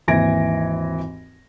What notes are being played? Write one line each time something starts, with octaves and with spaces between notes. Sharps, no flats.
G#1 D#2 E3 G#6 A#6 D7